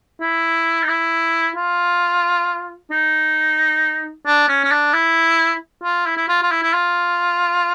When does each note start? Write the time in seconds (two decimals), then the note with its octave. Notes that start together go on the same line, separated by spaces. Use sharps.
0.20 E4
0.83 D#4
0.88 E4
1.56 F4
2.91 D#4
4.26 D4
4.48 C#4
4.64 C#4
4.71 D4
4.93 E4
5.83 F4
6.06 E4
6.17 E4
6.28 F4
6.43 F4
6.51 E4
6.62 E4
6.73 F4